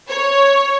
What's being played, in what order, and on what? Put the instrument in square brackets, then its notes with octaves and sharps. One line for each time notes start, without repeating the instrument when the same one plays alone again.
[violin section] C#5